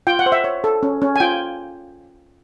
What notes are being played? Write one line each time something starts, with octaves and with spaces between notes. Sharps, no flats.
F4 G5
F#5
C5
E5
C#5
A4
C#4
C#4
G#5
F4 G5